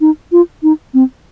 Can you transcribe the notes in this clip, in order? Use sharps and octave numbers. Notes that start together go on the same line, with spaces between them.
D#4
F4
D#4
C4